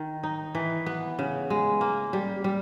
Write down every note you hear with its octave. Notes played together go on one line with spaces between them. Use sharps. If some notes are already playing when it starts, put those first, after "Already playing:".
Already playing: D#3
D#4
E3
B3
C#3
G#3
A#3
G3
G3